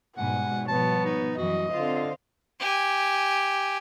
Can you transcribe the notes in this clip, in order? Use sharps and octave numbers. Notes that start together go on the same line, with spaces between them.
G#2 B2 G3 F#5 G#5
B2 F3 G3 B3 C#5 A5
D#4
F#2 E3 G3 F#4 D#5
D3 C4 F4 C5 F5
G4 G#5